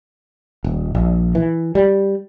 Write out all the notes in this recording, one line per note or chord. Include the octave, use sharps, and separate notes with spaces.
D#1
A#1
E3
G3